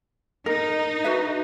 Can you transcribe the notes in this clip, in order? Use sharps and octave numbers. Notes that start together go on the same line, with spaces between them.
D#4 A#4
F#4 B4 E5